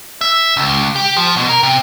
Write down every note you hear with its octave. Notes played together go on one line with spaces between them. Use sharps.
E5
C#2
G4
F3
B2
A#4
C3